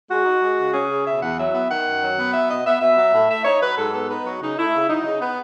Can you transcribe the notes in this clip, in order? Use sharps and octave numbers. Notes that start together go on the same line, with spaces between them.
G#3 F#4
D#4
G#3
C#3
C#4 G#4
C#3
B2 E5
E2 F#5
F#3 E5
B3
D#3 F#5
F#2
F#3
B3
F#3 E5
B2 D#5
B3 E5
B2 E5
F#3
A2
A3 E5
D#4 C#5
F#3 B4
G#2 A4
B3 A4
D#4 B4
F#3 F#4
C#3 D#4
A3 E4
C#3
F#3 D#4
C#3
B3